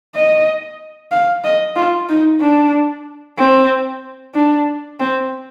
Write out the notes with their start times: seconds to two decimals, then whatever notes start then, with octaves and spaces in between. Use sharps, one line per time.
0.15 D#5
1.12 F5
1.44 D#5
1.76 F4
2.09 D#4
2.41 D4
3.38 C4
4.35 D4
5.00 C4